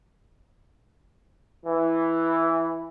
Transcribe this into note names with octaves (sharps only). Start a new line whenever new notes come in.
E3